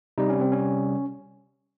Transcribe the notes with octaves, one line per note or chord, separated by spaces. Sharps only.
C3 G3 D#4
C#4
C4
C#4